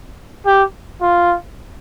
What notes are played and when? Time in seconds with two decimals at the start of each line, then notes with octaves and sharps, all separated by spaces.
0.46 G4
1.02 F4